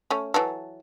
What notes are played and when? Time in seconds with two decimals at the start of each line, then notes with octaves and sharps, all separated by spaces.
0.10 A3 C#4
0.34 E3 F#3 A4